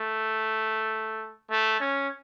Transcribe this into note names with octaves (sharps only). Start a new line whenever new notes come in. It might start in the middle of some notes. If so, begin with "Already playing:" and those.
Already playing: A3
A3
C#4